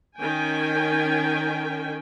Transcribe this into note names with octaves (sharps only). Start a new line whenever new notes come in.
D#3 C#4 G5 G#5